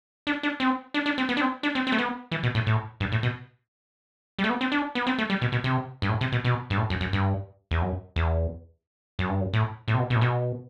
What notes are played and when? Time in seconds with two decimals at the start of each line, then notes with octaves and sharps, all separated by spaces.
0.27 D4
0.43 D4
0.60 C4
0.94 D4
1.06 D4
1.18 C4
1.29 B3
1.37 D4
1.41 C4
1.63 D4
1.75 C4
1.87 C4
1.92 A3
1.98 B3
2.32 E3
2.43 B2
2.55 A2
2.67 A2
3.00 G2
3.12 A2
3.23 B2
4.39 G3
4.44 A3
4.50 B3
4.61 C4
4.72 D4
4.95 B3
5.07 C4
5.18 A3
5.30 G3
5.42 B2
5.52 B2
5.64 C3
6.02 G2
6.09 A2
6.21 C3
6.32 B2
6.44 B2
6.70 G2
6.78 A2
6.90 F#2
7.01 F#2
7.13 G2
7.71 E2
7.82 F#2
8.16 E2
9.19 F#2
9.29 G2
9.41 F#2
9.53 A2
9.88 A2
9.94 C3
9.99 B2
10.10 B2
10.16 A2
10.21 B2